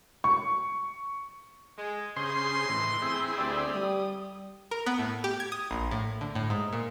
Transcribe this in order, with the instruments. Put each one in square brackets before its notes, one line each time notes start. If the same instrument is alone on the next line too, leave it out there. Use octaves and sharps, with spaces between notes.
[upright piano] C#6
[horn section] G#3
[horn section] G2 D#5 C6 [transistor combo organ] C#3 G#4 C5
[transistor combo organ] A2 E3
C4 E4 G#4
[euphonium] D2 [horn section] G4 D5
[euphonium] G3 [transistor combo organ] D#6
[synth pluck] A#4
B3
A2
G4
G#6
D#6
A#1
A2
D3
A2
G#2
A#2